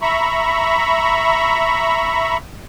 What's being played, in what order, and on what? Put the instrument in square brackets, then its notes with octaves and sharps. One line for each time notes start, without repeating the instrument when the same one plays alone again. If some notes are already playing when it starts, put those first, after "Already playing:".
[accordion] E5 A#5 B5 C#6